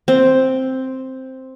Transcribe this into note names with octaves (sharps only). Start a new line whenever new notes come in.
C4